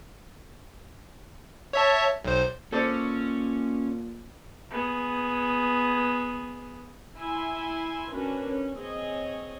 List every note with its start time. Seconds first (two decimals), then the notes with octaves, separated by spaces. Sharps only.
1.73 C#5 E5 A5
2.24 B1 C5
2.72 A#2 C#4 A4 C5 D5
4.71 B3 G#4
7.16 E4 E5 G#5 C6
8.12 C#4 D4 F#4 A#4 B4
8.47 C#4
8.76 C4 G#4 C#5 D#5